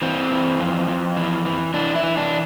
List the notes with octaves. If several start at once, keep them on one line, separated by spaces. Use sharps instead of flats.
E3 C4
E3
F2
F2
E3
E3
E3 D4
E4
E3
D4